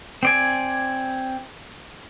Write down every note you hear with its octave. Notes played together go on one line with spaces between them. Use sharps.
C4 D5 G#5